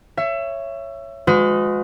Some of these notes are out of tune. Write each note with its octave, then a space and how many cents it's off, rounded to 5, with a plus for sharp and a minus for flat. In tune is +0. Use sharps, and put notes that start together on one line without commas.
C#5 +0 E5 +25
G#3 +0 F#4 -40 B4 +40